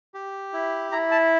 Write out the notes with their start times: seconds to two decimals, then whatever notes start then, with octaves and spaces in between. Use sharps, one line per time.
0.14 G4
0.53 E4
0.92 E4 A#5
1.11 A5